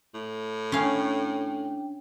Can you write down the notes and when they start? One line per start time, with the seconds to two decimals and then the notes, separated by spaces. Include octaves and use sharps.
0.14 A2
0.72 C#4 D4 F5 G5